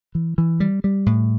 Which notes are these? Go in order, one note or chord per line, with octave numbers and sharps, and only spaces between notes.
E3
E3
G3
G3
A2